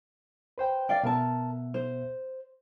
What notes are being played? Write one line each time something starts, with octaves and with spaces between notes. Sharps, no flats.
B4 C5 G5
D5 F5 G5
B2 B3 A#4 E5 A5
C5